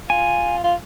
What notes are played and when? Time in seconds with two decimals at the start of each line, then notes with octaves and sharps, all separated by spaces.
0.09 F4 G#5
0.64 F4